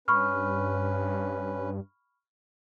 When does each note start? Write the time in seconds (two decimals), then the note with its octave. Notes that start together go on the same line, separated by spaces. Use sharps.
0.08 G2 C#4 B4 B5 C#6 F6